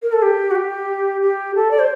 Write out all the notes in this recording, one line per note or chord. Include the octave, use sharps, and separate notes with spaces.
A#4
A4
G4
F#4
G4
G4
A4
D5
C5